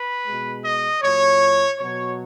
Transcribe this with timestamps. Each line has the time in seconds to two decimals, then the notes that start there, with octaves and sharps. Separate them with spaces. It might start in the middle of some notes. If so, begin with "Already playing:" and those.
Already playing: B4
0.27 B2 G#3
0.64 D#5
1.02 A#2 F#3 C#5
1.79 B2 F#3 C#5